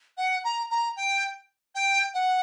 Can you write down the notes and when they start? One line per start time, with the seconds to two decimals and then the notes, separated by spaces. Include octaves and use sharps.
0.17 F#5
0.44 A#5
0.70 A#5
0.96 G5
1.75 G5
2.14 F#5